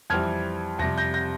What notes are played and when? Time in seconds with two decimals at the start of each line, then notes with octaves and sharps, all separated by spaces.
0.10 F2 E3 G3 C4 F6 G#6
0.79 F2 C3 G3 A#6
0.98 G6 A#6
1.14 G6 A#6